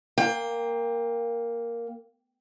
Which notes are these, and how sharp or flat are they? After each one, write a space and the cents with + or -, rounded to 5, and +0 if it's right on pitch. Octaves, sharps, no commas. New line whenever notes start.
A#3 +0 G5 +25